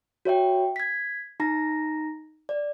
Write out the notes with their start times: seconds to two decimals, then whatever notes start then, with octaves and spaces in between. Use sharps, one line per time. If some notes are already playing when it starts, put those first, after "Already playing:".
0.25 F#4 C#5 E5 G5
0.76 G#6 B6
1.40 D#4 A#5 A#6
2.49 D5